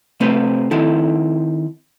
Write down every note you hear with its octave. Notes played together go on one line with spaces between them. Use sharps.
C3 A3 C4 B4 C5
D#3 C4 E4 A4